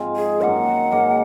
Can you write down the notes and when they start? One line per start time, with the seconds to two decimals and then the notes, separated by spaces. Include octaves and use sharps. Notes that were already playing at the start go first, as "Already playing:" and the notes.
Already playing: G#2 F3 G#3 C4 F4
0.16 G#4
0.41 F#2 D#3 A#3 D#4 F#5
0.92 G#2 F#3 A#3